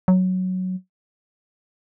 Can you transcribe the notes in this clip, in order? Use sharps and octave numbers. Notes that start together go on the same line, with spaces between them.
F#3